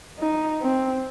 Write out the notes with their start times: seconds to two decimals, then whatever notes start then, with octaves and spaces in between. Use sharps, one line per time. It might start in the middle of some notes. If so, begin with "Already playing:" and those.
0.19 D#4
0.61 C4